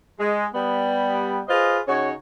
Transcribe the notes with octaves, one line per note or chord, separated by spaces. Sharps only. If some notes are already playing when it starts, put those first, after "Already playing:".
G#3
G3 B3
F4 G#4 B4 C5 D#5 F5
C#3 D#4 F#4 C#5